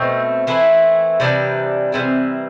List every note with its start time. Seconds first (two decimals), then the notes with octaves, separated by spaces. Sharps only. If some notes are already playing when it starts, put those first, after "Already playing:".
Already playing: B2 A3 C4
0.47 E3 A3 C4 E4
1.20 C3 E3 G3 D4
1.92 C3 E3 G3 C4